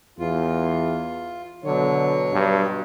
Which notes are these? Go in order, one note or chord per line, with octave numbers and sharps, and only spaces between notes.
E2 F4
B2 D3 F#3 C#5
G2